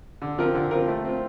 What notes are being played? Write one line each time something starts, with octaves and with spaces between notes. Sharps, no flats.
D3
F3 C4 F4 A#4
D3
F3 C4 F4 A#4
A3
C4 F4